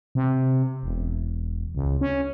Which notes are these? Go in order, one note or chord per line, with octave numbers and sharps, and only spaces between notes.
C3
E1
C#2
C#4